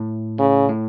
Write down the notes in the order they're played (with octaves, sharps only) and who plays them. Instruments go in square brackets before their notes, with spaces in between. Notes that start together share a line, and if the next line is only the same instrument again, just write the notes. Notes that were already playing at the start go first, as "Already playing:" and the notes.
Already playing: [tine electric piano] A2
[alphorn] C#3
[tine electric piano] A2